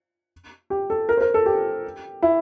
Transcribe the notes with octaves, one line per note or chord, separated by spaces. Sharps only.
G4
A4
A#4
C5
A#4
A4
G4
E4